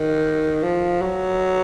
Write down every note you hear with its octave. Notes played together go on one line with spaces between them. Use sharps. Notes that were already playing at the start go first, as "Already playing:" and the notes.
Already playing: D#3
F3
F#3